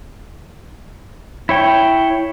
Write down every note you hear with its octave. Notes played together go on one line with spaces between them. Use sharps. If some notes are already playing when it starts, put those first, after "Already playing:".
E4 C#5 G5